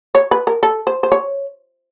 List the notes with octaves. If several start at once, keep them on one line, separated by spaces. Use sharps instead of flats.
C#5
B4
A#4
A4
C5
C5
C#5